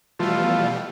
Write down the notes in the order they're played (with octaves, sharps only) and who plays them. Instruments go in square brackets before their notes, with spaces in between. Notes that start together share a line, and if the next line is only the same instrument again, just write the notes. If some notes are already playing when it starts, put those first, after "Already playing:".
[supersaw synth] B2 G3 [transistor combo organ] E3 F3 A3 [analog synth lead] F4